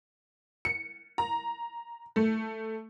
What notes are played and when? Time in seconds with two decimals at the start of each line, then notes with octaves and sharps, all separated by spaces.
0.65 C#7
1.18 A#5
2.16 A3